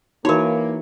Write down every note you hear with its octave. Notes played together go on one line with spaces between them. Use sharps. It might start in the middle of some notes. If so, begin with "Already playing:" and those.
E3 A#3 D#4 F#4 A#4 C#5